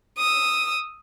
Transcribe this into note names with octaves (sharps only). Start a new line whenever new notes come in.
D#6 E6